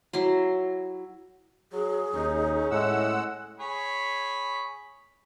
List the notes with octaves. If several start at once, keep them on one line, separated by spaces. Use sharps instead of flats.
F#3 E4 C6
F#3 G#4
D#2 C#4 D#4
A2 G#3 F#5 E6
G#4 C#5 B5